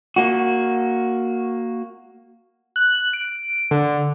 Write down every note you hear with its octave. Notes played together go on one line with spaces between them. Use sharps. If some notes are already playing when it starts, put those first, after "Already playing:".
A#3 F#4
F#6
D7
D3